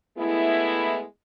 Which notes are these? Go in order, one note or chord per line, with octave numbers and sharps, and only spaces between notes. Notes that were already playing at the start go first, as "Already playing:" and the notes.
G#3 A3 B3 E4